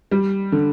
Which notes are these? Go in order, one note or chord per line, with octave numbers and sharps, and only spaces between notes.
G3
D3